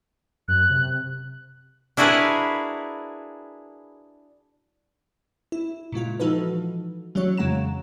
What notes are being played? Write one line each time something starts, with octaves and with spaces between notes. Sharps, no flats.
F#2 F#6
C3
D4 E4 F#4 G#4 A#4 B4
E4
A#2 C#3 G#3 F4
E3 F3 D#4 F#4 A4 B4
E3 F#3 C#4 F#4 C#5
F2 C#3 G#3 F#5 A#5 E7